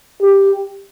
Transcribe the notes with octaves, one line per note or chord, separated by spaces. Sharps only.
G4